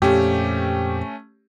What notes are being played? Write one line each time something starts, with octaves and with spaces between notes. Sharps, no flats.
F2 A#2 A3 C#4 G4